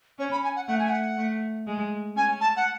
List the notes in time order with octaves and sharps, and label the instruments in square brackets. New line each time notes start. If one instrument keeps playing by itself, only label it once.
[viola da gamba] C#4 [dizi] C#5
[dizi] B5
G#5
F#5
[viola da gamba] A3 [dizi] F#5
[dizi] G#5
F#5
[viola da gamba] A3
G#3
[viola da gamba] C#4 [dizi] G#5
[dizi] A5
F#5